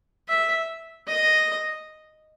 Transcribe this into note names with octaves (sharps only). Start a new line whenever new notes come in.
E5
D#5